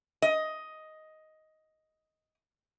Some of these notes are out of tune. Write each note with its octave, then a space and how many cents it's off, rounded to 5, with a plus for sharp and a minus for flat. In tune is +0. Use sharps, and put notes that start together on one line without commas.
D#5 +10